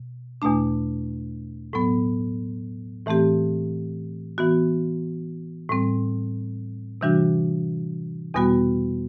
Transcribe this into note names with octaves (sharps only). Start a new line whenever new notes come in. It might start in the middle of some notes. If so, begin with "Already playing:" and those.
Already playing: B2
E2 B2 A3 D4
A2 F#3 B3
A2 E3 A3 C4 G4
E3 B3 F#4
A2 G3 C4
C3 E3 G3 D4 F#4
E2 B2 G3 B3 F#4